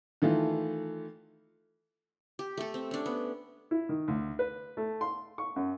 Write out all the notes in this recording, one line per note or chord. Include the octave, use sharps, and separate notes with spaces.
D#3 E3 A3 F4
G4
A3 A4
C4
C#4 D4
B3
E4
D#3
D2
B4
A3
C6
C#6
F#2